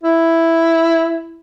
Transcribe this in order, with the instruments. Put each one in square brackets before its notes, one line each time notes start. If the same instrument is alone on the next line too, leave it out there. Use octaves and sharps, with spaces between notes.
[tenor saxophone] E4